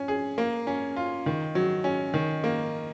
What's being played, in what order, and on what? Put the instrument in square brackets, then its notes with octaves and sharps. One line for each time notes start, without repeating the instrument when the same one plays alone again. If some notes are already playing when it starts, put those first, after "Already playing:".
Already playing: [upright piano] C#4
G#4
A#3
C#4
F4
D#3
F#3
C#4
D#3
A#3